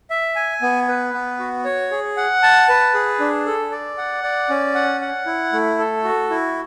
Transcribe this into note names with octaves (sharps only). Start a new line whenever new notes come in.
E5
G#5
B3
B4
B3
F#4
C#5
G#4
F#5
A5
B4
G#4
D4
A4
D5
F#5
D5
C#4
F#5
F#5
E4
A3
A4
F#4
E4